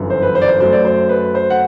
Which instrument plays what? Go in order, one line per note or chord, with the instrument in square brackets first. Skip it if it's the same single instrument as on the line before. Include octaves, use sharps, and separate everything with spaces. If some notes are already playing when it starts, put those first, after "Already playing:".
Already playing: [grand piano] G1 F#2 E3
C5
B4
C5
D5
C5
F#2 F#3 A3 C5
D5
C5
B4
C5
F#5